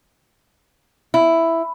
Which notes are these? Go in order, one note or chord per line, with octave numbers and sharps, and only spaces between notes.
E4